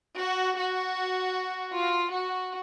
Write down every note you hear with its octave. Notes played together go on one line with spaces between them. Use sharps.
F#4
F#4
F4
F#4